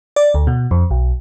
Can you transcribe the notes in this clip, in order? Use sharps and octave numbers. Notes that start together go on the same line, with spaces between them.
D5
D2
B2
F2
B1